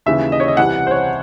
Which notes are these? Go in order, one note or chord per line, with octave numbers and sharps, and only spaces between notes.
D#2 C#3 E3 E5
D#5
C#5
D#5
C2 C3 E3 F#5
C5
C#5